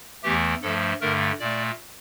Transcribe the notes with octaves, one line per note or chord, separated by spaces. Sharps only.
E2 E3 A3 G4
G2 F3 A3 A4
G2 D3 A3 A#4
A#2 A3 D5